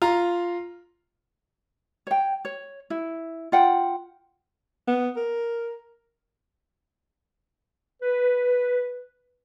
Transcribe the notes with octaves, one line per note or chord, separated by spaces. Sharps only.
F4 A#5
C#5 G5
C#5
E4
F4 F#5 G5
B3
A#4
B4